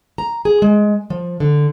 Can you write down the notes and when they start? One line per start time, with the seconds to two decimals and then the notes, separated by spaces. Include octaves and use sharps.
0.18 A#5
0.45 G#4
0.62 G#3
1.10 F3
1.40 D3